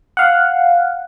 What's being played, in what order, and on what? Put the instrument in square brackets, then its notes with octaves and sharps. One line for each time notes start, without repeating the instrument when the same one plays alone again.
[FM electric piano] F5 F#5